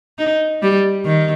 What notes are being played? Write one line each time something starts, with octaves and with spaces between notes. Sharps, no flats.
D#4
G3
D#3